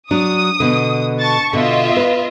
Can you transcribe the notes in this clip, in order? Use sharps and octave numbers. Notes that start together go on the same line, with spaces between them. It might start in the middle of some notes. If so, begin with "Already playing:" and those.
F#3 D4 D#6
B2 D3
A5 C#6 A6
B2 D3 F4 D#5 E5
B4